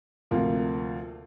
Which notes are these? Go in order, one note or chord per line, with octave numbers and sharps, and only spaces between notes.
D2 C3 F3 A#3 F4